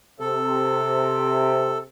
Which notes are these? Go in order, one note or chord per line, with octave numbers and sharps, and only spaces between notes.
C3 A4